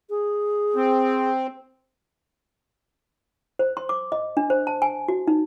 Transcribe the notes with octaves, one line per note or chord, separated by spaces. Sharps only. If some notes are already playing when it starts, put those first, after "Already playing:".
G#4
C4
C5
C6
D6
D#5
D4
C5
A5
G#5
F#4
D#4